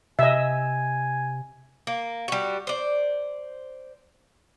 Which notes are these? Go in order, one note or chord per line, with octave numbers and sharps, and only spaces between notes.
C3 D#5 E5 G#5
A#3
G3 F#4
C5 D5